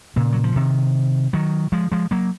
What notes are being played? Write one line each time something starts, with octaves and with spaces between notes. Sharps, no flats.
A#2 C#3
F#3
F3
C3 D#3
D#3 F#3
F3 G#3
F3 G#3
F#3 A#3